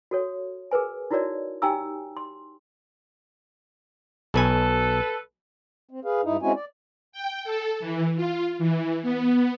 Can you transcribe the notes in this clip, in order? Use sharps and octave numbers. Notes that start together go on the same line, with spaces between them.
F#4 A4 C#5
G#4 A#4 B4 G#5
D#4 E4 F#4 A#4 C#5 D5
D#4 G4 G5 G#5 A#5 E6
C6
B1 B2 A4 B4 G#5
C4
G#4 B4 F5
G2 D#4 E4
G#3 C4 C#4 E4 F#4 G#5
D5
G5
A4
E3
F4
E3
B3